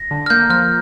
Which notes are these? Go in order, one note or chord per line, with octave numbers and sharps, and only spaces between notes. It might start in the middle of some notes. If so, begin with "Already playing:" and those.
Already playing: A#6
D3
F6
A#3 G6
F3 F6